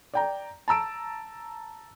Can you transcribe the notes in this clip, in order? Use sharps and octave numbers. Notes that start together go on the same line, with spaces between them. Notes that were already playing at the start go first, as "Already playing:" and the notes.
D5 G5 A#5
A5 A#5 E6 D7